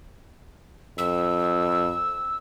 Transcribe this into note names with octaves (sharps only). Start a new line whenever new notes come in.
F2 E6